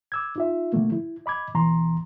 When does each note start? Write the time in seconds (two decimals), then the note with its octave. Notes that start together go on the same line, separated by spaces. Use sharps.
0.12 D6 E6 G#6
0.36 D#4 F4 E5
0.73 B2 D3 F3 A3 A#3
0.92 E4
1.26 D#5 B5 D6 G#6
1.54 D2 B2 E3 A#5 C6